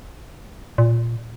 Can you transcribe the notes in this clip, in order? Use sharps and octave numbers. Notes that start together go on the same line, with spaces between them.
A#2